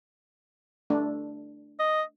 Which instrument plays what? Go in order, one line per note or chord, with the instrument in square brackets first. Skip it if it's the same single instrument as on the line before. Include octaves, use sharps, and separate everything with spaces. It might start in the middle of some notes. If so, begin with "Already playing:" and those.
[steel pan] A3 D4
[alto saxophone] D#5